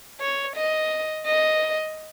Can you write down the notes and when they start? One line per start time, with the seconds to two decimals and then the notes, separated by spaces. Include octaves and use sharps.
0.20 C#5
0.56 D#5
1.26 D#5